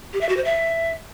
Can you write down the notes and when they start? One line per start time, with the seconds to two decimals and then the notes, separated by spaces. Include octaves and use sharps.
0.13 G4
0.21 E5
0.29 F#4
0.37 C5
0.45 E5